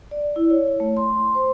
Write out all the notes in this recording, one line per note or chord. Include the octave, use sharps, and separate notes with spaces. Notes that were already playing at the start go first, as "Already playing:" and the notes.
D5
E4
C#5
A3
C6
C5